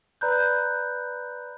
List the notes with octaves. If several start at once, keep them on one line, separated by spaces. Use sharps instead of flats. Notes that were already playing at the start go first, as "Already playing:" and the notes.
B4 D5 A#5 B5 F#6 G6